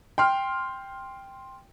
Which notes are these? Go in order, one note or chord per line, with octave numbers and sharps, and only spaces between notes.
G5 C6 F6